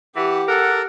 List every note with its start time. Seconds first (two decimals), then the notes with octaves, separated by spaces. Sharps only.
0.16 E3 G4 F#5
0.48 A4 A#4 F#5